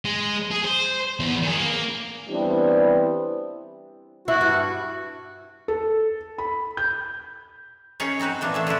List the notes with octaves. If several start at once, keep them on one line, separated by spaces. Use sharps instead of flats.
G#3
G#4
C5
E2
D#3 G#4
A#3
E3 G3 B3 C4 D4 E4
E4 F#4
G2
A4
B5
G6
C#4 D#4 G#4 C#5
C4 D#4 F#4 B4
A#2 E3 D4
A3 G#4 E5
D3 G#3 D4 E4